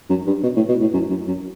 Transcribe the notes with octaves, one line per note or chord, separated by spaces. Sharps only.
F#2
G2
B2
A2
B2
A2
F#2
F#2
F#2